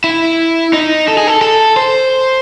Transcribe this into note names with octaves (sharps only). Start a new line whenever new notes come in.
E4
D#4
A4
G#4
A4
A4
C5